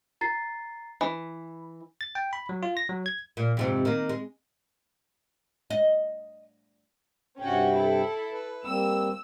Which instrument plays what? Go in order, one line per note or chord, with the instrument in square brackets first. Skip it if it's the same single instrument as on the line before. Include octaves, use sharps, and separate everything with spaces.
[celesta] A#5 A6 C7
[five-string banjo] E3 [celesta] B5
[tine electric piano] A6
G5
B5
F#3
F4
A#6
F#3
G#6
[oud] A#2
F2 G#2 C3
D#3 A#3
G#3
D#5
[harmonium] G2 C3 G5 [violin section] C#4 F#4
[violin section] E4 A4
[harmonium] B4
[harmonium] G3 A#3 C4 [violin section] E6